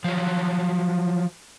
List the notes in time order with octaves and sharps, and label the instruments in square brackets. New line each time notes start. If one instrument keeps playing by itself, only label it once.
[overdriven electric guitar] F3 F#3